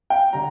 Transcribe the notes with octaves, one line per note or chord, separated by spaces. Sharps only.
G5
D3 G3 A#5